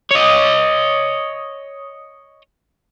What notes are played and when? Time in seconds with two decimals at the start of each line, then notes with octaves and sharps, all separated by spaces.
0.11 C#5 D#5